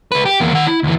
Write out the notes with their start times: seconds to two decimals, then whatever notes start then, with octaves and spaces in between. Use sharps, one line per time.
0.12 C#2 B4
0.25 G4
0.40 E2 A#3
0.53 D#3 F#5
0.66 E4
0.83 D2 E3